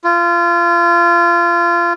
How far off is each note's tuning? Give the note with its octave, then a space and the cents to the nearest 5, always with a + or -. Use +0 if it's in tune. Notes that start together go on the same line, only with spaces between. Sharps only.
F4 -25